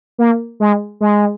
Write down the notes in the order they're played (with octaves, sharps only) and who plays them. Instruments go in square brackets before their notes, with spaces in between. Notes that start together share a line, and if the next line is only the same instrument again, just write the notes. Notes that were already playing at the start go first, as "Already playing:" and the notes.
[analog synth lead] A#3
G#3
G#3